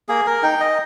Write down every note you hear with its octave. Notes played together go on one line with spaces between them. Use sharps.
A#3 G#4
A#4
D#4 G5
D#5